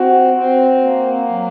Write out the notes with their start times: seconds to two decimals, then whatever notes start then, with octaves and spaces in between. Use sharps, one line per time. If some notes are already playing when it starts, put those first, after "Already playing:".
Already playing: C4 F#4
0.34 C4
0.81 A#3
1.28 F#3